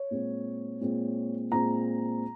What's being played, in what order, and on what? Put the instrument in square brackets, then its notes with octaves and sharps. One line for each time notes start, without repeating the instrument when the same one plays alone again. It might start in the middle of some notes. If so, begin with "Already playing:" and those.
Already playing: [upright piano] C#5
A#2 G#3 C4
A#2 G#3 C4
A#2 G#3 C4 A#5